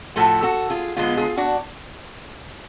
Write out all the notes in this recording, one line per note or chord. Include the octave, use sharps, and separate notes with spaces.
A2 F3 A3 F#4 A4
F#4 A4
F4 G#4
D3 G#3 B3 F4 G#4
F4 G#4
D4 F#4